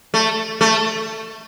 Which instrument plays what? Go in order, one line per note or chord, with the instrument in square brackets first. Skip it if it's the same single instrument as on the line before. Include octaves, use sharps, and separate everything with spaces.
[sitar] A3
A3